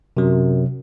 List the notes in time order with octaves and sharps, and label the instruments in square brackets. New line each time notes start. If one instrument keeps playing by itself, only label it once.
[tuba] F#2 [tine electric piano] C3 F#3